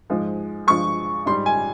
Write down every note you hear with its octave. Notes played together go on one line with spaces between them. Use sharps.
G#2 F3 G#3
G2 F3 G#3 C#6
G#2 G3 C6
G#5